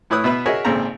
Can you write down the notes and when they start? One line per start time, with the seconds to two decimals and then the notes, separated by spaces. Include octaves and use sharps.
0.10 A2 E4 B4 C#5 D#6 F#6
0.24 B2 B3 B4 E5 B5
0.46 F#4 G#4 A#4 C#5 D#5 E5
0.65 G#1 A#2 C#3 C4 A4 A#5